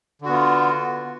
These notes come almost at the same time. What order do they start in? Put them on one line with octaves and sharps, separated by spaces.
D3 F#4 B3 F4